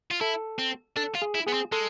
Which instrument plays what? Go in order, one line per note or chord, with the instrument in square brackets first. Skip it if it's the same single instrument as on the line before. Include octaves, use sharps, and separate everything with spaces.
[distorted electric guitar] F4
[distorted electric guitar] E4 [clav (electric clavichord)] A4
[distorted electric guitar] C4
[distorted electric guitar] D4 [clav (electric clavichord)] A4
[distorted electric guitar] F4
[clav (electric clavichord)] G#4
[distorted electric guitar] E4
[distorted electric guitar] B3 [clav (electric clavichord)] G#4
[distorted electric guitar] C4
[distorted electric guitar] G#3 [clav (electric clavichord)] A4